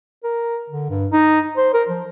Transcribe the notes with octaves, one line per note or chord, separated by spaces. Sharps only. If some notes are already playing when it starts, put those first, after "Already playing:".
A#4
D3
G2
D#4
C5
A#4
F3